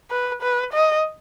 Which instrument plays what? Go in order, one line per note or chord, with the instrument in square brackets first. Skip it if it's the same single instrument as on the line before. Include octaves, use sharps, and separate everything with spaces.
[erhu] B4
B4
D#5